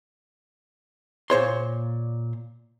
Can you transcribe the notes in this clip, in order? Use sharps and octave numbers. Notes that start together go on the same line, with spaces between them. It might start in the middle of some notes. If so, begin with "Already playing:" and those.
A#2 C5 C#5 C6